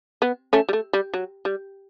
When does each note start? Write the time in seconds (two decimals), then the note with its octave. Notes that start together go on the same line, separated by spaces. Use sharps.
0.22 B3
0.53 A3 C#4
0.69 G3
0.73 A3
0.93 G3
1.14 F#3
1.45 G3